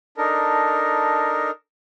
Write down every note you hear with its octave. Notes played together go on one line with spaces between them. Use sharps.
D4 D#4 A4 A#4